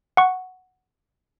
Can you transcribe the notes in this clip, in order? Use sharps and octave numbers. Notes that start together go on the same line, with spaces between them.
F#5 C#6